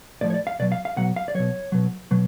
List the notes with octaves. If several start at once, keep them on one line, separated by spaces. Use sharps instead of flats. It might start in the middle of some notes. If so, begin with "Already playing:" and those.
A2 F3 D5
C#5
D5
F5
B2 F#3 D5
F5
F5
B2 F#3 F#5
F5
D5
B2 F#3 C#5
B2 F#3
B2 F#3